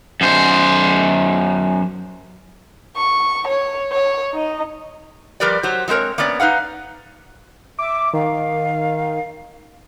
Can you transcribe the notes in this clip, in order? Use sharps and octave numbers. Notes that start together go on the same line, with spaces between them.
F#2 C5
C#6
C#5
C#5
D#4 D#5
F3 G3 G4 A#4 B4 D5
F#3 G4 C5
F#3 G#3 C4 A#4 C#5
A#3 B3 C#4 D5
D#4 B4 F5 F#5
E5 D6
D#3 F5